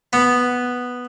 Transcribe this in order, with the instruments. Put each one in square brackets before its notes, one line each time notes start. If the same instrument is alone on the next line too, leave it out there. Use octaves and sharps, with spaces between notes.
[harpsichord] B3